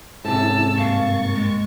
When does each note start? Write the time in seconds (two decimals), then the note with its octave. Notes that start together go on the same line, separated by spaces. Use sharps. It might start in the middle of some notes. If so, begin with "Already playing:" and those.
0.25 G#2 C3 C#4 E4 A4 A5 E6
0.78 G2 A#3 F5 C#6 A6
1.35 G#3